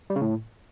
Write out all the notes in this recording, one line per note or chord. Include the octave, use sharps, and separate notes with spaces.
G3
C#3
A2